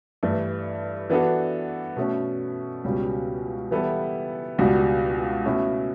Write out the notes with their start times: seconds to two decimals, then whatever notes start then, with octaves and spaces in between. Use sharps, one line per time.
0.23 G2 E3 A3
1.10 E3 B3 D4 F#4 A4
1.97 B2 A3 C#4
2.84 C#2 B2 G3 C#4
3.71 E3 G3 B3 E4 A4
4.58 C#2 B2 G3 D4 F#4
5.45 B2 A3 C#4 E4